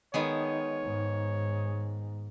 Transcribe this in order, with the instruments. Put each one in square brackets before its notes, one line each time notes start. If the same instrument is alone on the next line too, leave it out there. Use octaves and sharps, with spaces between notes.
[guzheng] D#3 G#3 B3 [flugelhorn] C#5
[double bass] G#2